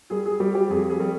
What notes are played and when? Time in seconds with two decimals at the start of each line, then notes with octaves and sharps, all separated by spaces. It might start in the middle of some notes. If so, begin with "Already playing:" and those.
0.10 G3 G#4
0.26 G#4
0.40 G3 G4
0.55 G4
0.70 F2 G#4
0.90 G#4
1.00 G3